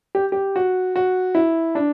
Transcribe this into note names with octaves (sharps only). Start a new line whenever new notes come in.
G4
G4
F#4
F#4
E4
D4